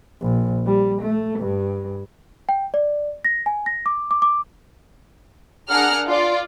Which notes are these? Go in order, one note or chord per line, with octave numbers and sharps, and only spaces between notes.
A#1
G3
A3
G2
G5
D5
A#6
G#5
A#6
D6
D6
D6
D4 G#4 A#4 F#5 F6
F4 D5